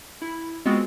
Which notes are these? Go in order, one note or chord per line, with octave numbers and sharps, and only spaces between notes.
E4
G#3 B3 C4 F4 F#4 G#4